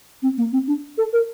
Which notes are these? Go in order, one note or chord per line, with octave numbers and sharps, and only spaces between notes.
C4
A#3
C4
D4
A4
A#4